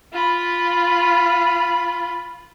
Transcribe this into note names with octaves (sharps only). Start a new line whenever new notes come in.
F4 B5